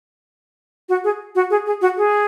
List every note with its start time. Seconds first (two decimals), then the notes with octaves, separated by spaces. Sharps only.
0.89 F#4
1.04 G#4
1.35 F#4
1.50 G#4
1.66 G#4
1.81 F#4
1.97 G#4